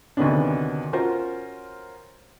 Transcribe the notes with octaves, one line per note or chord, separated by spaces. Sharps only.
D2 C3 D#3 B3 C#4 D4
C#4 F4 F#4 A#4 C5 C#5